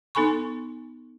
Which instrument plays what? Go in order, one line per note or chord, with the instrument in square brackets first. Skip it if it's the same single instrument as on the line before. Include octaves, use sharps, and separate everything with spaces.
[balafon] B3 D#4 A4 G#5 B5 C#6